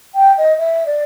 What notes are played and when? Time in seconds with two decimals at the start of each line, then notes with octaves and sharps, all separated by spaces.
0.14 G5
0.37 D#5
0.57 E5
0.85 D5